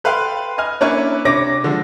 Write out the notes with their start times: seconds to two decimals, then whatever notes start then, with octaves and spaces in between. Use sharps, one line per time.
0.04 A4 B4 F5 G5 C6 F#6
0.58 D#5 G#5 F6
0.81 A#3 C#4 D4 E4 B4 C#5
1.25 C3 D4 C#5 D6 A#6
1.64 D3 F3 G#3